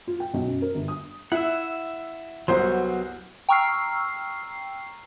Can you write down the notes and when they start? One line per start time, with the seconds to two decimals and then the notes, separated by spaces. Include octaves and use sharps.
0.07 F4
0.20 G5
0.34 B1
0.47 F#2
0.62 A#4
0.75 G1
0.88 D#6
1.32 E4 E5 F#5
2.48 C2 F#3 B3 F#4 C5 C6
3.49 G5 A#5 C#6 E6 F6 C7